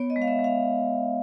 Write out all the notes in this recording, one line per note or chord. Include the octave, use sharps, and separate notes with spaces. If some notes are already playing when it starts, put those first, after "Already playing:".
Already playing: B3 C#5
D#5
G#3
F5
E5
G#3
F5